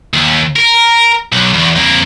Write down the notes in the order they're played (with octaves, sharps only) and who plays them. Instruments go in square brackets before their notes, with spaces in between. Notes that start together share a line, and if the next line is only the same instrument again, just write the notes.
[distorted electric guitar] D#2
A#4
B1
E2
F2 A#3